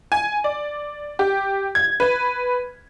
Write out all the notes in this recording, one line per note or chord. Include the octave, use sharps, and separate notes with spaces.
G#5
D5
G4
G#6
B4